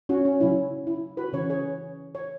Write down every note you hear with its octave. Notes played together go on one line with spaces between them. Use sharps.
C#4 F#4
C#4
C#3 F#3 C#4 E4
E4
F#4 B4
C#3 E3 C#4 C#5
G#4 C#5
C#5